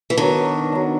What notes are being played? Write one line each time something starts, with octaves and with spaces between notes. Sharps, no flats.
E3
D#3 F#3 B3 D4
F#3 B3 D4